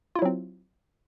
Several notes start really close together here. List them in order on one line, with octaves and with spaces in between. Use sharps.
F4 E4 F#3 C4